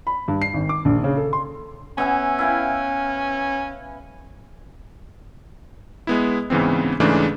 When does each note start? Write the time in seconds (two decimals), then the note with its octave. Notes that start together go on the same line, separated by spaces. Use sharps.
0.07 B5
0.28 G2
0.42 C7
0.54 G#1
0.69 D6
0.85 A#1
1.04 C#3
1.17 A4
1.33 C6
1.98 B3 C#4 E5 G#5
2.39 E4 F5 G5
6.07 G#3 B3 E4
6.50 G#2 C#3 E3 B3 C4
7.00 G#2 C#3 E3 G#3 A3 D4